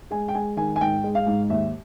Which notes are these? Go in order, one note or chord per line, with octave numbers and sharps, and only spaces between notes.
G#3 G#5
G5
G#3 G#5
D#3 G#5
G#5
G#2 G5
G#3
F5
G#2
D#2 E5